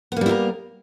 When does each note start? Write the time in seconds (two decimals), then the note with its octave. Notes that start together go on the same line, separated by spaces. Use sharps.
0.12 B3
0.16 A#3
0.21 G3
0.26 E4
0.31 A#4